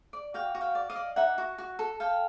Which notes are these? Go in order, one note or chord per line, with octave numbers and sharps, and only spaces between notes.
D5
F#4 F5 G5
F#4
F5 G5
D5
D#5 F5
D5
D#4 E5 F#5
F#4
F#4
A4
A4 F5 G5